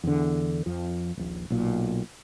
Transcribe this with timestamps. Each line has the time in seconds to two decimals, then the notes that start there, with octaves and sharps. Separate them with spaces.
0.04 E2 D3
0.66 F2 F3
1.17 D#1 A#1
1.50 B1 A#2